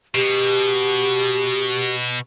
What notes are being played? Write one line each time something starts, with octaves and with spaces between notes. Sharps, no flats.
B2 G4